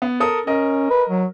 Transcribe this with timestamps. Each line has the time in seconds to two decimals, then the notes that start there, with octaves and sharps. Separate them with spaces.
0.02 B3
0.20 A4 A#4 D#6
0.47 C#4 A#4 D#5
0.91 B4
1.09 F#3